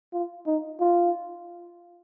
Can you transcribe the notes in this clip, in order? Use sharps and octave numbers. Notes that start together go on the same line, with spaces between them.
F4
D#4
F4